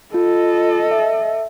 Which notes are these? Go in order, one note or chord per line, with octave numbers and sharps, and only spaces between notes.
F4 A4 D#5
E5